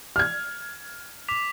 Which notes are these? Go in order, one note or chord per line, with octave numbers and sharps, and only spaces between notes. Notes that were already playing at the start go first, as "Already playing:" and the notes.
F6 G#6
D6 B6 F7